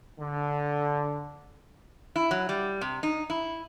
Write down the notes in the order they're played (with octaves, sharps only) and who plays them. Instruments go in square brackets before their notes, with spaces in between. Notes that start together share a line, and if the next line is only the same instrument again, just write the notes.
[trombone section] D3
[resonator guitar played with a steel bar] E4
F#3
G3
C3
D#4
E4